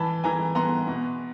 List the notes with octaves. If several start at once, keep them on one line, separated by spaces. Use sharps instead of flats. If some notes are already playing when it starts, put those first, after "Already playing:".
Already playing: E3 A5 B5
E3 G#5 A#5
B3 A#5 C6
B2